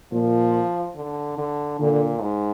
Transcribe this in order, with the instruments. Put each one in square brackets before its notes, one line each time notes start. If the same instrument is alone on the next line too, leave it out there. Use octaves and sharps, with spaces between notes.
[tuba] A#2 [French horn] F3
[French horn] D3
D3
[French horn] A#2 [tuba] D3
[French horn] G#2